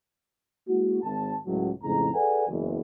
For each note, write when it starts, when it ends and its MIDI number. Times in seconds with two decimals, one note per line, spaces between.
0.69 1.02 56
0.69 1.02 58
0.69 1.02 64
0.69 1.02 66
1.03 1.34 32
1.03 1.34 81
1.46 1.70 37
1.46 1.70 45
1.46 1.70 54
1.83 2.10 41
1.83 2.10 45
1.83 2.10 49
1.83 2.10 56
1.83 2.10 82
2.14 2.47 68
2.14 2.47 69
2.14 2.47 71
2.14 2.47 74
2.14 2.47 78
2.14 2.47 80
2.49 2.80 30
2.49 2.80 40